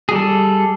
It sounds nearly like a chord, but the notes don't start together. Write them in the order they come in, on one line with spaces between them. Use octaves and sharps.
G#4 G3 A4